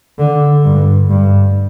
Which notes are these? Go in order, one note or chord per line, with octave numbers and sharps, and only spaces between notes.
D3
G2
G2